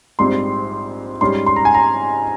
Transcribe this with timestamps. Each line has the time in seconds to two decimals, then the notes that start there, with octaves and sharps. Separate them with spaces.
0.19 A#1 G#2 G3 C4 C6
1.21 G#2 G3 C#4 C6
1.46 C6
1.56 A#5
1.65 G#5
1.75 A#5